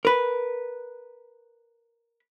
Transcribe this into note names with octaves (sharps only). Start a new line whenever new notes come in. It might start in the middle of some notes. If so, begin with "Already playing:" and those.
A#4 B4